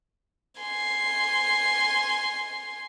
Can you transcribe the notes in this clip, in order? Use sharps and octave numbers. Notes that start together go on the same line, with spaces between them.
G#5 C6